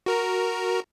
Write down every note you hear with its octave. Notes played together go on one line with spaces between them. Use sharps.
F#4 A#4 A#5